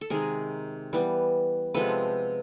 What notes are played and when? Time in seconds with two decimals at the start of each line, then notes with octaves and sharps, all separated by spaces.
0.01 A4
0.10 C3 D#3 G#3 G#4 A#4
0.93 E3 G3 B3
1.74 C3 F3 G#3 B3 A4 B4